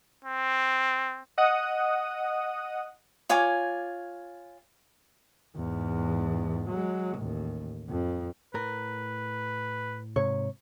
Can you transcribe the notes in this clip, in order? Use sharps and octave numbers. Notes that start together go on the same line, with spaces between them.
C4
D#5 F#5 D#6
F4 C#5 G#5 D6
E2 G#2
F#3 G#3
A1 D#2
F2
A2 A#4 B4
G#2 C3 C#5